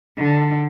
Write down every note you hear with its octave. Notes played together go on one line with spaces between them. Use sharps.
D3